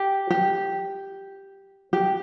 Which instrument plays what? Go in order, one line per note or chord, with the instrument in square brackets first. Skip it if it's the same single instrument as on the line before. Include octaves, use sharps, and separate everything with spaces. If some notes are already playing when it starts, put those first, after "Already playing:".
Already playing: [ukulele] G4
G4
G4